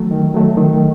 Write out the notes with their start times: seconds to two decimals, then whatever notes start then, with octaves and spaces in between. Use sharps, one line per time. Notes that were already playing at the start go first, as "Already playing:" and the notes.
Already playing: D#3 F#3 A3
0.11 D#3
0.34 F#3 A3
0.57 D#3